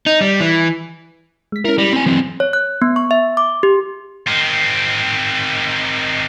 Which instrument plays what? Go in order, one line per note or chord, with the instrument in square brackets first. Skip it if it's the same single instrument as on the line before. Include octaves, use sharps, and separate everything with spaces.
[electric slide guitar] D#4
G3
E3
[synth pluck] G#3 B6
[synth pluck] C#4 E4 [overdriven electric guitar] A#4
[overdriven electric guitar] G3 [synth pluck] A#6
[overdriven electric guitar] C4 G#5
[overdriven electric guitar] E3 C4 [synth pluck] F#3
[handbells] C#5
F#6
B3
C#6
E5
D6
G4
[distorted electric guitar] D#3 C4